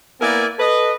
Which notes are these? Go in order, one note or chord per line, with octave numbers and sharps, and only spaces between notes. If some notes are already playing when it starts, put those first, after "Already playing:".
A#3 B3 E4 A#4 D5 G#5
A4 B4 D#5